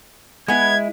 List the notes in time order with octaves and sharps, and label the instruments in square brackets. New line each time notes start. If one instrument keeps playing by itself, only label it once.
[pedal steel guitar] G#3 E4 [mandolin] B3 G#5 [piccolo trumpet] G#6